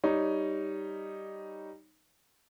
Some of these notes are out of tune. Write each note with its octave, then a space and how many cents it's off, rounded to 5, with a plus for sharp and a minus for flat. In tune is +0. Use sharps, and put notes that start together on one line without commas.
G3 +0 D#4 +0 C#5 +10